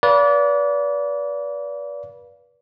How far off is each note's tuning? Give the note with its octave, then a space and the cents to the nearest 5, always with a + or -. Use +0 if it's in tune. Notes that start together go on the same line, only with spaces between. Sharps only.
B4 -30 D5 -30 F5 +0